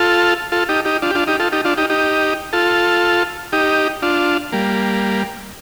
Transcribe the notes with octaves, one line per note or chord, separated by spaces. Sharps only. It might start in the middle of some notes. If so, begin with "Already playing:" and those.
Already playing: F4 A4
F4 A4
D#4 G4
D#4 G4
D4 F4
G4
D4 F4
D#4 G4
F4 A4
D#4 G4
D4 F4
D#4 G4
D#4 G4
F4 A4
D#4 G4
D4 F4
G3 A#3